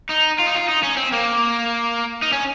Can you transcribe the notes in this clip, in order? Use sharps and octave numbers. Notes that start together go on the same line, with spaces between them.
D#4
F4
D#4
F4
D#4
C#4
C4
A#3
D#4
C#4